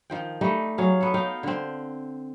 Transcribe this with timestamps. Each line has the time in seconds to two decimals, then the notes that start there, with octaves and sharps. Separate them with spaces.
0.10 D#3 F3 G5
0.41 G3 A3 D#4 D#5
0.78 F#3 G#4 F5
1.01 B3 A4
1.14 D#4 F5 G5
1.43 D3 C4